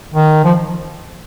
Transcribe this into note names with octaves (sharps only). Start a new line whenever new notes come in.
D#3
F3